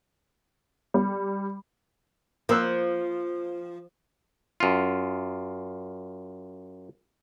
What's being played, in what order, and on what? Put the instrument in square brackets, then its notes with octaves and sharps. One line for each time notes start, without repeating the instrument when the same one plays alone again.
[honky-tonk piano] G3
[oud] F3 [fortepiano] A#3 E6 F#6
[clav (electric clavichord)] F#2 F4